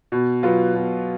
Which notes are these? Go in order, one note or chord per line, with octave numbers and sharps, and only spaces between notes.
B2
F#3 B3 F4
B2